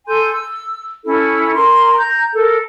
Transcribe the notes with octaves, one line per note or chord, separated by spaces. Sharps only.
A4 G#5 C6 G6
E6
C#4 E4 A4
A#4 A#5 C6
A#5 G6
A4 A#4